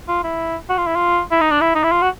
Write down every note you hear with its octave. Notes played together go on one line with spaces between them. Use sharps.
F4
E4
F#4
F4
E4
F4
E4
D#4
D4
E4
D#4
E4
F4
F#4